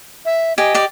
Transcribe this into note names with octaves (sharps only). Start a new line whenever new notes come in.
E5
G4 D#5 G#5
G4 D5